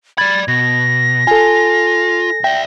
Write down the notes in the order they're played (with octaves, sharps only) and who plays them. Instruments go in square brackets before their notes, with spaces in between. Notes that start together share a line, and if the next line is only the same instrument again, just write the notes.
[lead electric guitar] D5 B5 [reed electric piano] G#6 [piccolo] A6
[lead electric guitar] B2 [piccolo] A#6
[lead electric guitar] F4 [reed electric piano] A4 G#5
[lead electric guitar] D5 E5 [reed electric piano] G5